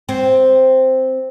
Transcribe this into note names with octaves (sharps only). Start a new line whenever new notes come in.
C4